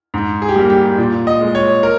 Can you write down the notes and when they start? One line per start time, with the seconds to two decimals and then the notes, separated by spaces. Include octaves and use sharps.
0.14 G#2
0.42 G#4
0.49 G4
0.56 G3 A#3 G#4
0.70 G4
0.98 A#2
1.27 D#5
1.41 G#3
1.55 C#5
1.83 A#4